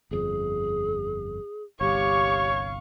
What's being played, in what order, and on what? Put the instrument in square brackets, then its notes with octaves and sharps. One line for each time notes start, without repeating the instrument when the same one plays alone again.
[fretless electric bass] G1 F2 [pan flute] G#4
[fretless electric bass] G1 C2 [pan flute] G4 [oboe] C#5 [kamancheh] F5 C#6